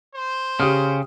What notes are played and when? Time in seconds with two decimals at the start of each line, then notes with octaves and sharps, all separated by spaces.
0.15 C5
0.60 C#3 G4 D#6 F6